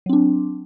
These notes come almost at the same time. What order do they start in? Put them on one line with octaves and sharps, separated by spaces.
F#3 C4 D4